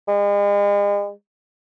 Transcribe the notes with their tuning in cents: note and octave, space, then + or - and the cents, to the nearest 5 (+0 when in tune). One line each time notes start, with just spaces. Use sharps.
G#3 -40